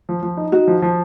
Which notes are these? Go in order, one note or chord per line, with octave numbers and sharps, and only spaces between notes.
F3
F3
D#4
D#4 F#4
F3
F3